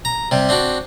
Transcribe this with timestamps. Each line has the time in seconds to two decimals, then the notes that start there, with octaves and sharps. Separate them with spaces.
0.05 A#5
0.31 C3 G3
0.49 C4 D4 F#4